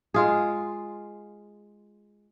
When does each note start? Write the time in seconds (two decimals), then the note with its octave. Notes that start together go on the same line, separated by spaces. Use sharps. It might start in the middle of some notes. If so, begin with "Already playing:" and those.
0.14 G#3 F4 G#4